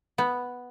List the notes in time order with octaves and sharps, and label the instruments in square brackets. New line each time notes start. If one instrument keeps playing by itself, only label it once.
[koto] B3